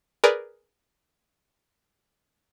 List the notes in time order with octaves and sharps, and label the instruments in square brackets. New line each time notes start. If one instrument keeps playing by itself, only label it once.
[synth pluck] G#4 A#4 B4 D5